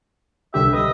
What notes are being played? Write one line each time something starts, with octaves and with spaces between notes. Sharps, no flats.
C2 D3 G4 E5
B4 D#5